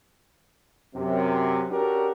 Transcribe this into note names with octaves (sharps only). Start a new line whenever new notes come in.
F#2 C3
C#4 D4 F#4 G4 A4 A#4